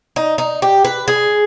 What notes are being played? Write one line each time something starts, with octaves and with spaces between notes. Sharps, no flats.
D#4
D#4
G4
B4
G#4